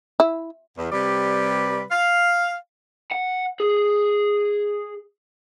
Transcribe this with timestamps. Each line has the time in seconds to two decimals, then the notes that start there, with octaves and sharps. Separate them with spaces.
0.20 E4
0.77 E2
0.92 C3 G3 B4 D5
1.91 F5
3.12 F#5
3.60 G#4